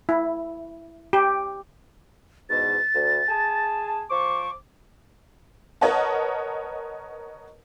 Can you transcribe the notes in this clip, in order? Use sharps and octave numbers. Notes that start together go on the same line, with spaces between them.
E4
G4
E2 G#2 B2 A6
D2
G#4 G#5 A5
F3 C5 C#6 D6
A#4 B4 C#5 D#5 F#5 A5